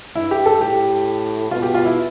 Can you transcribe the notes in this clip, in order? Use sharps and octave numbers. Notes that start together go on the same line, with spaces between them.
G2 E4
G4
A4
A2 G4
B2 F4
G4
F4
E4